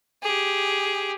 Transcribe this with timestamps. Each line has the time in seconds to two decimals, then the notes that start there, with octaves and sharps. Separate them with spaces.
0.23 G4 G#4